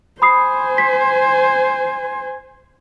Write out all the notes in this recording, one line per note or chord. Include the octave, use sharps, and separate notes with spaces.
C5 G#5 B5 D#6 C7
B6